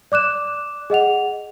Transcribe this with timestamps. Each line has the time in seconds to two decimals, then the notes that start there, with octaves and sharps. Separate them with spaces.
0.12 D5 D6 F#6 E7
0.90 G#4 D#5 F#5 F7